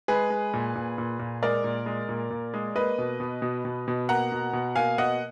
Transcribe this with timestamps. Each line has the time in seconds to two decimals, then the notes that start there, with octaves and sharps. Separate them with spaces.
0.08 G#3 G#4 B4
0.30 G#3
0.54 A#2
0.75 A#2
0.98 A#2
1.19 A#2
1.42 G#3 A#4 D5
1.64 A#2
1.86 G#3
2.09 A#2
2.30 A#2
2.54 G#3
2.75 A#3 B4 D#5
2.98 B2
3.20 B2
3.42 B2
3.65 B2
3.88 B2
4.09 A#3 F#5 A#5
4.32 B2
4.53 B2
4.75 A#3 F5 G#5
4.98 B2 D#5 F#5